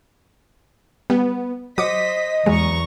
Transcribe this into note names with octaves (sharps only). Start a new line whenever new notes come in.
G3 B3
F#3 C5 D#5 D6 D#6 B6 C#7
E2 F#3 G#3 A#5 C#6